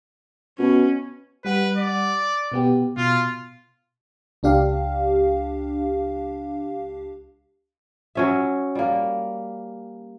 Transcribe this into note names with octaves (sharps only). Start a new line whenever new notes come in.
B2 C#4
G3 B4 F#5
D5
B2 B3 G4
B2 F4
C#2 D4 G4 F5
F#3 C#4 E5
G3 A#3